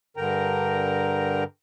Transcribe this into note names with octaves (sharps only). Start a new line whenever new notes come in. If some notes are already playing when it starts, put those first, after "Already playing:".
G2 D3 A#4 G5 A#5